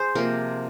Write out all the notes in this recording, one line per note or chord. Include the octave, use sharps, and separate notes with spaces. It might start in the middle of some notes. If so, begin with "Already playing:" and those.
Already playing: G#4 C5
C3 F3 A#3 A#4